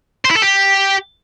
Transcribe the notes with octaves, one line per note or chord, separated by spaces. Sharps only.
C5
E4
A4
G4